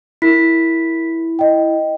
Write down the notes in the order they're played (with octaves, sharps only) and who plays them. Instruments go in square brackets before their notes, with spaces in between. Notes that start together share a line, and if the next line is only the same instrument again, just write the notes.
[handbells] E4 [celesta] A#4 B6
[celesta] D#5 G5